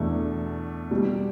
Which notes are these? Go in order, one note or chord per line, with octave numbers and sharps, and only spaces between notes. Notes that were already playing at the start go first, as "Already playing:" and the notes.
Already playing: E2 B2 A3 D4
B2 G3